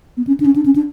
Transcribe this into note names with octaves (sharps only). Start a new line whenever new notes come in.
B3
C#4
D4
C#4
D4
C#4
D4